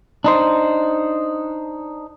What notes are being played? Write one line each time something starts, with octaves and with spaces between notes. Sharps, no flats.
D4 D#4 C5